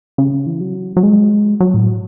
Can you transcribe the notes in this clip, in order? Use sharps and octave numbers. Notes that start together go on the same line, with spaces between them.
C#3
E3
F#3
F#3
G#3
F#3
A2